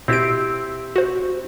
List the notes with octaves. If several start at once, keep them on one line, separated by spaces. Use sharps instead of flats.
B2 C4 E4 G4 D7
F#4 C5